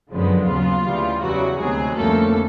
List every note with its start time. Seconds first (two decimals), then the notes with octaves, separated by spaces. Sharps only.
0.11 F#2 D3 F3 G#3 B3
0.47 D#2 C#3 F#3 B3 F4
0.85 D2 C#3 E3 G3
1.21 E2 C#3 E3 F#3 G3 F#4
1.58 D2 C3 D#3 F#3 G#3 B3 G#4
1.96 F2 D3 G3 A3 A#3 C#4 A4